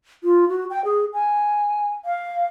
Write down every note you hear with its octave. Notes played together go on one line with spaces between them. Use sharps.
F4
F#4
G5
G#4
G#5
F5